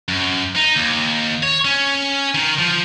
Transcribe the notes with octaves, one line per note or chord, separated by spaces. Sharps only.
F#2
D#4
D#2
C#5
C#4
D#3
F3